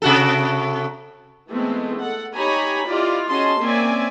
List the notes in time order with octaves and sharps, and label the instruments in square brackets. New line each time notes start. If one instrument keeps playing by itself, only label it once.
[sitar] C3 F#4 A4
[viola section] E3 G#3 A3 B3 C4
A4 F#5
D#4 G4 C#5 G#5 A#5 B5
E4 F4 G4 D5 D#5
C#4 F#4 G#4 D#5 A5 C6
A#3 C4 C#4 D5 E5 G#5